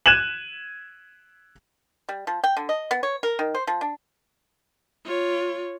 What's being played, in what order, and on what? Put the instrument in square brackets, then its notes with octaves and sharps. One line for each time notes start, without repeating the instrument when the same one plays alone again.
[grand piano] F#6 G#6 D#7 E7 F#7
[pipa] G3
F3
G5
D3
D#5
B3
C#5
A#4
D#3
C5
F3
D4
[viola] F4 C#5